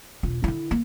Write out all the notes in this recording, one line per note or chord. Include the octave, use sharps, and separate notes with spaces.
E1 F4
D3 E4
A#3